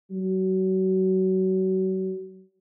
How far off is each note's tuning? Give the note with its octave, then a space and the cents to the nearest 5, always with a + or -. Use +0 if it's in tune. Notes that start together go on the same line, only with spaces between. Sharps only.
F#3 +30